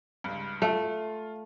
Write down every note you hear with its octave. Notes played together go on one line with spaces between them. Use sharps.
C#2 G2
A3 F4